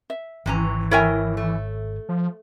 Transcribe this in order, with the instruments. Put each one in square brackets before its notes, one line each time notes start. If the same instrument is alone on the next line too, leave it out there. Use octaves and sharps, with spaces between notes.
[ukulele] E5
[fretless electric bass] G#1 [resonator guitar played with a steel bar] C3 C#4 A#5 [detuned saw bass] E3
[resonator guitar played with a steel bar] E4 A#4 G5 [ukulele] C#5 E5 G#5
[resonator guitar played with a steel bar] A3
[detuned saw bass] F3